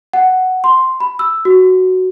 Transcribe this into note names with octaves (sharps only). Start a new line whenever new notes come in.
F#5
C6
B5
E6
F#4